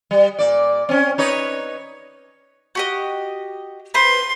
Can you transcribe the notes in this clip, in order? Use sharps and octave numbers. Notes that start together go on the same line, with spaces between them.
G3
A#2 D5
C4 C#4
D#4 B4 C#5
F#4 G4 D#5
B4 C5 C6